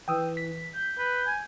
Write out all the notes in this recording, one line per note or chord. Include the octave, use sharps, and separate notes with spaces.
E3 G5 D#6 E6
B6
G6
B4
G#5